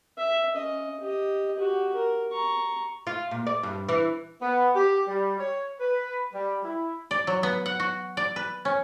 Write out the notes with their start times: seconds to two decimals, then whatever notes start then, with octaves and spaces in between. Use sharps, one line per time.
0.18 E5
0.53 C#4 D#5
1.00 G4 D#5
1.56 F#4 G4
1.95 A#4
2.32 A#5 C#6
3.07 F4
3.31 A#2
3.47 D5
3.63 G2
3.89 E3
4.42 B3
4.75 G4
5.07 G3
5.39 C#5
5.80 B4
6.33 G3
6.64 E4
7.11 D5
7.27 F#3
7.43 B3
7.66 F#5
7.80 F#4
8.17 D5
8.36 B4
8.65 C#4